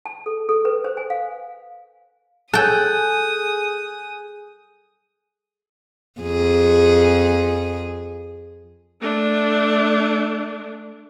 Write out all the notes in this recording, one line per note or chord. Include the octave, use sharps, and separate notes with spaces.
A5
A4
A4
B4
C5
G#5
F5
G#4 A4 G5 G#5 D#6 F#6 G6
F2 G#4
A3 D4